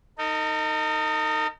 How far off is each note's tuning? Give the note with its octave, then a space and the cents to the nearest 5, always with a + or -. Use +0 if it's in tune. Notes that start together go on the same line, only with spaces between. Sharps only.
D#4 +0 A#4 -45